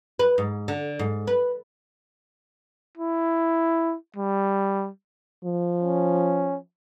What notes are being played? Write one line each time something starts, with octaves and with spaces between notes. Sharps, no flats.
B4
G#2
D3
G#2
B4
E4
G3
F3
C#4